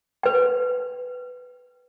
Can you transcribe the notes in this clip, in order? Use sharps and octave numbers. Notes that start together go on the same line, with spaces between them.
B4 G5